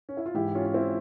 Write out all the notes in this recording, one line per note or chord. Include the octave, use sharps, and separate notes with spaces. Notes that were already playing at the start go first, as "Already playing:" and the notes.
C#4
E4
F4
G#2 E3 E4 G4
C#4 F4
C#4
C4 E4